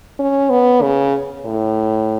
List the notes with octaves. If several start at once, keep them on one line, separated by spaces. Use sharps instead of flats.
C#4
B3
C#3
A2